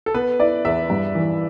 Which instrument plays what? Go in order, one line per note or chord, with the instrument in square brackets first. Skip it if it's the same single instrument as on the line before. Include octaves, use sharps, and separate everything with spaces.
[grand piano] A4
[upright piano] B3 [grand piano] B4
[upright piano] E4 [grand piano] D5
[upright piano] E2 [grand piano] E5
[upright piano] G2
E3